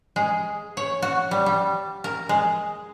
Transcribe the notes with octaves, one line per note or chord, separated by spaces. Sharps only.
G#3
C#5
F#4
G3
G3
A#4
G#3